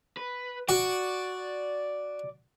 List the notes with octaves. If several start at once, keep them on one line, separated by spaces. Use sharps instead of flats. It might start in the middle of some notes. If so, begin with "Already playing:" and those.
B4
F#4 D5